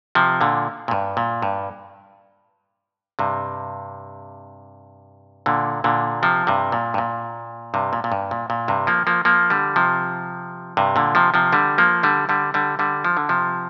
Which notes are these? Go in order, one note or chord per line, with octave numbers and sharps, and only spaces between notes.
C3 F3
A#2 D3
A#2
G2
A#2
G2
G2 C3
A#2 D3
A#2 D3
C3 F3
G2 C3
A#2
G2
A#2
G2 C3
A#2
A#2
G2
A#2
A#2
G2 C3
F3 A#3
F3 A#3
F3 A#3
D3 G3
C3 F3
G2 C3
A#2 D3
C3 F3
C3 F3
D3 G3
F3 A#3
D3 G3
D3 G3
D3 G3
D3 G3
F3
D3
C3 F3